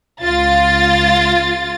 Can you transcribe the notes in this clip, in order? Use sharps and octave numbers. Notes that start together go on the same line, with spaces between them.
C#2 F4 A6